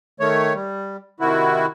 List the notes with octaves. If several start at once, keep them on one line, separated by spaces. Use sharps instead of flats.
D#3 A3 C#5
G3
C3 D#3 E4 F#4